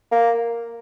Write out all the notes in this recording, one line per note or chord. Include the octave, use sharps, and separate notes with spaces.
A#3